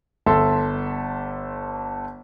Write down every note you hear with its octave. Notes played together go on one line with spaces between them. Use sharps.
G1 A4 E5 C6